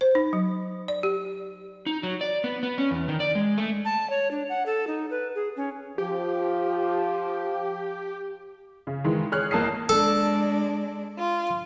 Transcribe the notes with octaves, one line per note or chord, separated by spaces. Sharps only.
C5
D#4
F#3
D5
G4
D#4
F#3
D5
B3
B3
C#4
E2
D#3
D5
G#3
A3
A5
C#5
D4
F#5
A4
D#4
B4
G#4
C#4
F3 G4
C#3
D#3 E3 G#3
G#4 C#5 F6 F#6
A1 A#3 A5 D#6 C7
G#3 D4 A4
F4